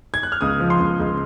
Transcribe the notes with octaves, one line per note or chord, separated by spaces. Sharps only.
G#6
F#6
F6
C#2 D#6
F3
C6
C#2
C#2